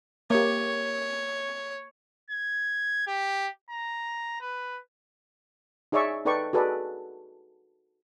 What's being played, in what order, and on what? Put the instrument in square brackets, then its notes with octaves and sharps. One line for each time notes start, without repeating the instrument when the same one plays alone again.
[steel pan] A#3 G4 [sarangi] C#5
[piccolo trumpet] G#6
G4
A#5
B4
[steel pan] D#4 G#4 C#5 D5 E5 C#6
D#4 A4 B4 D5 G5 C#6
F#4 G#4 A4 B4 D5 D#5